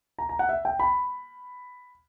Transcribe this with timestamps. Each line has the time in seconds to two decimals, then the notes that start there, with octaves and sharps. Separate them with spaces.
0.19 A#5
0.29 A#5
0.39 F#5
0.49 E5
0.65 G5
0.79 B5